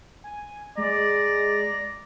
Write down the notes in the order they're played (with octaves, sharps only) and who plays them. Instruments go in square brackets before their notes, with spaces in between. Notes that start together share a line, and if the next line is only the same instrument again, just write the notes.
[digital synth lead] G#5
[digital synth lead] G#3 [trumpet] D5 [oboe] A#5